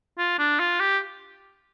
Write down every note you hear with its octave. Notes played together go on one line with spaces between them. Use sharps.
F4
D4
F4
G4